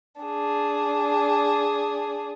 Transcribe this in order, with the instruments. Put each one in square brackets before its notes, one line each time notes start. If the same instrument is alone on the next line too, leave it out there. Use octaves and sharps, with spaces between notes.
[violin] D4 G#4